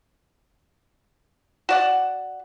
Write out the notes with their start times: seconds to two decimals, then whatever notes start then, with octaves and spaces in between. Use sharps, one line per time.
1.69 F#4 D5 F#5